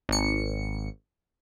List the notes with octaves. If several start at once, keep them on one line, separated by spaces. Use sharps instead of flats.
G#1 C#7